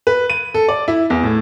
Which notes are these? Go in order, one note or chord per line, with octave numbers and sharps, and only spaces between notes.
B4
D#7
A4
D5
E4
E2
A2